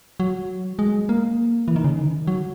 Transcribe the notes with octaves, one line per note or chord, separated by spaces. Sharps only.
F#3
G#3
A#3
E3
D#3
C#3
D#3
F#3